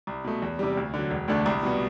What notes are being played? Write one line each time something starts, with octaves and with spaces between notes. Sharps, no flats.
C2
B2 A3
E2
C3 G3
D2
D3 F#3
E1
D2 D3 A3 D4
C2
B2 G3 B3